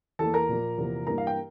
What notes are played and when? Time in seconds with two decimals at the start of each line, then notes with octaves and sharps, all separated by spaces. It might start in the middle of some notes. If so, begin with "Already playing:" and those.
0.19 E2 E3 A#3 A4 A5
0.34 A#4 A#5
0.49 A#2 F3 A#3
0.78 E2 C3 F3 A#3
1.07 G2 E3 A#3 A#4 A#5
1.18 F5
1.27 G5